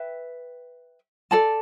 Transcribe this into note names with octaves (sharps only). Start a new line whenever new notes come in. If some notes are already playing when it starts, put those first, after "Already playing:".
Already playing: B4 E5 G5
A4 D5 A5